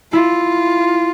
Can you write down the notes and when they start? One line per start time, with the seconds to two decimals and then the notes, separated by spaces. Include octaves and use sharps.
0.12 E4 F4